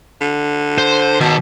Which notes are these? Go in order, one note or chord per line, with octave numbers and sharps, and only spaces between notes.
D3
C5
B2 D#3 A5